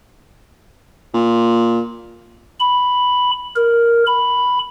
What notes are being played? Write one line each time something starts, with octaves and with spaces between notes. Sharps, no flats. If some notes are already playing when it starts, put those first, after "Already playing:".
A#2
B5
A#4
B5